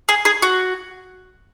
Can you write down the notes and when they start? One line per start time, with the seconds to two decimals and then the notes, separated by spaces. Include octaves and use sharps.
0.09 G#4
0.25 G#4
0.42 F#4